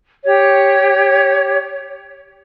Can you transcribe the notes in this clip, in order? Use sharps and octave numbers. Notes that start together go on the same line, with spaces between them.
G4 C#5